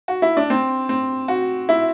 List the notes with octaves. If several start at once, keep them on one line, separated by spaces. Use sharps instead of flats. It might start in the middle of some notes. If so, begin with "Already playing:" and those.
F#4
E4
D4
C4
C4
F#4
E4